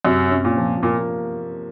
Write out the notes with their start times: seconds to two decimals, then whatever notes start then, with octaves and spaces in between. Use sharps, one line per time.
0.05 F#2 C3
0.30 C#4
0.45 A#2
0.57 F3
0.83 A#2 A#3